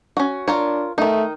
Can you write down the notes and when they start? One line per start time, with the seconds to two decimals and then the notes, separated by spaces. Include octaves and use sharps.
0.17 C#4 F#4
0.48 D4 F4 A#4 C#5
0.98 D#3 A3 D#4